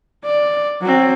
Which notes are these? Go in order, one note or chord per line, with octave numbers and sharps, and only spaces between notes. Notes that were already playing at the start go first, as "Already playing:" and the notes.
D5
F#3 C4